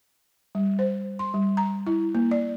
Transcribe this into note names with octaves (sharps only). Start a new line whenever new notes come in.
G3
C5
C6
G3
A#5
E4
A#3
D5